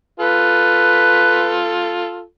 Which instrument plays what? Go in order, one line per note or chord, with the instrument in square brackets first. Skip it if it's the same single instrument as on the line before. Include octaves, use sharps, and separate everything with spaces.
[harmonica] F4 A4 [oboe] B4